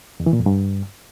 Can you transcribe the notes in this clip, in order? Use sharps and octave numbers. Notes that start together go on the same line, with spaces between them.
E2
E3
A#2
F2
G2